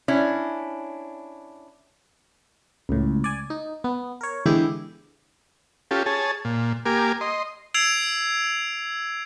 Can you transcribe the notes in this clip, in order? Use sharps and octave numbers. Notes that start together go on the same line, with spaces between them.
C#4 D4 E4
C#2 A2
D5 G#5
D#4
B3
A#4 C#5
D3 E3 G#3 B3 E4 G4
C#4 F4 G4 A4
G#4 C#5 A5
A#2
A#3 G4 A#4 G#5 D6
D#5 C6
E6 G#6 C7 D7 F7